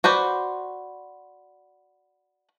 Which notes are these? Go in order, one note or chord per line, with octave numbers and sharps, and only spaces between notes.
F#4 B4 C5 D5